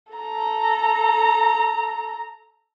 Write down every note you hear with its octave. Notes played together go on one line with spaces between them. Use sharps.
A4 A#5